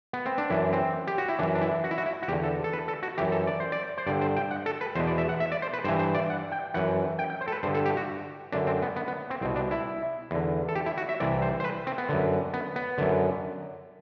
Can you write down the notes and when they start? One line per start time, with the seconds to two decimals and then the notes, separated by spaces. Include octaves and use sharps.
0.13 B3
0.26 C4
0.38 D4
0.50 F#2 E3 E4
0.73 C4
1.07 G4
1.18 F#4
1.29 E4
1.39 F#2 E3 D4
1.55 D4
1.62 E4
1.84 F#4
1.91 E4
1.98 F#4
2.06 E4
2.23 F#4
2.28 E2 G4
2.32 D3
2.43 A4
2.64 A4
2.73 B4
2.88 A4
3.03 F#4
3.18 F#2 E3 G4
3.32 A4
3.47 D5
3.60 C5
3.72 D5
3.98 C5
4.07 G2 D3 D5
4.21 C5
4.37 G5
4.51 F#5
4.66 A4
4.81 B4
4.95 E2 C5
4.99 B2
5.07 D5
5.18 E5
5.29 F#5
5.40 E5
5.52 D5
5.62 C5
5.73 B4
5.84 G2 E3 C5
5.99 C5
6.15 D5
6.30 F#5
6.52 G5
6.74 F#2 E3 F#5
7.19 G5
7.30 G5
7.41 C5
7.48 A4
7.52 B4
7.63 G2 D3 C5
7.75 A4
7.86 G4
7.97 F#4
8.52 F#2 D3 D4
8.67 C4
8.82 B3
8.96 B3
9.08 B3
9.30 C4
9.41 C2 C4
9.45 B2
9.56 D4
9.71 E4
10.31 E2 D3
10.69 A4
10.75 G4
10.86 E4
10.98 F#4
11.09 E5
11.20 C2 C3 E3 D5
11.42 C5
11.60 C5
11.64 B4
11.87 C4
11.98 B3
12.09 F#2 D3
12.54 B3
12.76 B3
12.98 F#2 D3